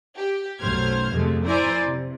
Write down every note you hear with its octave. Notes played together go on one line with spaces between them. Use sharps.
G4
B1 F#2 A3 C5 F6 G#6
F2 C3 G#3 A3
E4 C5 D5 G#5 A#5
C3